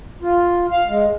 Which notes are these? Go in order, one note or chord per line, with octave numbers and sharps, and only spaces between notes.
F4
F5
G#3